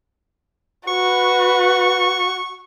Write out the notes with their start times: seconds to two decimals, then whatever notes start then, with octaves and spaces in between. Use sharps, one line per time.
0.88 F#4 B4 C#6